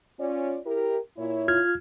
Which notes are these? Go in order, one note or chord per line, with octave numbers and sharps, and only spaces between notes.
C#4 F4 D5
E4 G4 A#4
A#2 E4 C#5
F4 F6 G#6